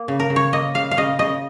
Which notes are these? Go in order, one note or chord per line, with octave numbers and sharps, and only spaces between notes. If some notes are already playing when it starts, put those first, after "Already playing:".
Already playing: A#3
C#3
A#4
C#3
C#5
A#3 D#5
C#3 F5
F5
C#3 D#5
C#3 D#5